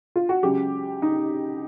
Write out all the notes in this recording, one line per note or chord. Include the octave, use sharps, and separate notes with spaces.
F4
F#4
C#2 C#3 F#3 G4
D#4